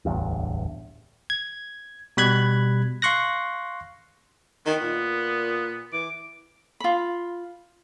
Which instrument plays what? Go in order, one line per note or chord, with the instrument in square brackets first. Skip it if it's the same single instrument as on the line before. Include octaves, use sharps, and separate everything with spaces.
[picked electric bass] D1 A1 E2 G2
[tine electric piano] G#6
B2 G3 B5 F#6 G#6
F5 C6 C#6 F#6 A#6
[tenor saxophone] D#3 [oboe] B3
[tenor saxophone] A#2
[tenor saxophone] E3 [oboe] D6
[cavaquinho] F4 B5